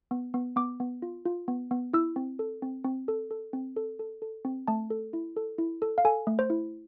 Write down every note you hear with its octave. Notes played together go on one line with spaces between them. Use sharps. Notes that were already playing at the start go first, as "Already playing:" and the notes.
B3
B3
B3 D6
B3
F4
F4
B3
B3
E4 E6
C4
A4
C4
C4
A4
A4
C4
A4
A4
A4
C4
A3 A5
A4
E4
A4
E4
A4
F5
A4 G#5
A3
C5
E4